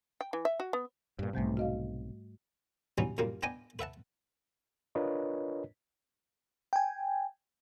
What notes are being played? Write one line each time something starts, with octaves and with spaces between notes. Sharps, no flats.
G5
E3
E5
F#4
B3
G2 A#2
B1 G#2 C3 G3 A3
F#4 D#5 F5
E3 F#3 G3 B3 C#4 D#4
F#2 A#2 G3 A#3
B3 D4 D#5 G5 G#5 D6
B4 E5 F#5 A5
D4 F4 A#4 B4 C#5 D#5
G5 G#5